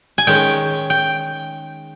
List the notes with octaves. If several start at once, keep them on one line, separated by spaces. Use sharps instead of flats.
G#5
D#3 G#3 C#4 G5
G5